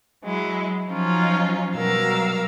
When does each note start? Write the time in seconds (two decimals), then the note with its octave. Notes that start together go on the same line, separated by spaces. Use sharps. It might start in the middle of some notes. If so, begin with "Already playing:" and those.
0.23 F#3 G#3 E4
0.90 F3 F#3 C#4 D#4 F4
1.75 B2 F#3 G3 A#4 F5 E6